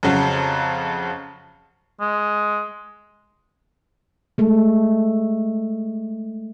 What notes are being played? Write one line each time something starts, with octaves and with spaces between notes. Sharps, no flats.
F2 C#3 F#3
G#3
G#3 A3